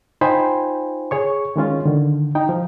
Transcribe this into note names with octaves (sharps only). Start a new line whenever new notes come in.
D#4 F4 C5 G5 G#5 B5
G#4 C#5 C#6
D#3 G#3 C#4 F4
D3 D#3
D#4 G5
F3